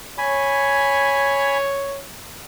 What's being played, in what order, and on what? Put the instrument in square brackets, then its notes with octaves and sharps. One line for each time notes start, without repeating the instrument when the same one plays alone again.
[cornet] C#5 [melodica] G#5 B5